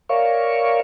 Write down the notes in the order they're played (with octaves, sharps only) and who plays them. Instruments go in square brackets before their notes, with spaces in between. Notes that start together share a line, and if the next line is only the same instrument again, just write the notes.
[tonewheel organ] A#4 C#5 D5 E5 F5 C#6